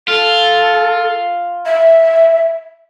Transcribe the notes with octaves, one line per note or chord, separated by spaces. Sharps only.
F4 A4
E5